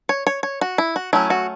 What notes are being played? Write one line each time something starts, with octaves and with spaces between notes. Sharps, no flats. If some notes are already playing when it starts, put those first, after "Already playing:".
C#5
C#5
C#5
F#4
E4
F#4
F#3 A3 C#4 E4
F#4